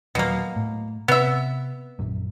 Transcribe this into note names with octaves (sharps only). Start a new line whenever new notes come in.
D#1 B2 F#3 A#3
A2
C3 B3 E5
A#1 F#2